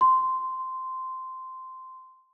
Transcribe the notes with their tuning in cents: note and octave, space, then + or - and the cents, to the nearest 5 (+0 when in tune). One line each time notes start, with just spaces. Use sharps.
C6 -10